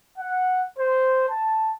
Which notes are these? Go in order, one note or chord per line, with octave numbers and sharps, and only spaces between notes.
F#5
C5
A5